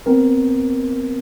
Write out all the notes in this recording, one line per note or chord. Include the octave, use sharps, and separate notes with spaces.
B3 C4 A#4